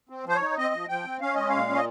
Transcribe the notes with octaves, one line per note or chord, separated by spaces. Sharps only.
C4
F3 C5
C#5
D#4
C4 D#5
F3
F3 G5
C4
C#4 F5
G#3 D#5
A#2 F5
C#4
D#5